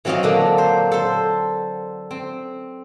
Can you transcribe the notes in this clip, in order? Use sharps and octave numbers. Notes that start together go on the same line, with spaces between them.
E3 F#3 C4 F4 C#5 D#5
A#2 D3 A#3 D4
C5
A4 C5
C4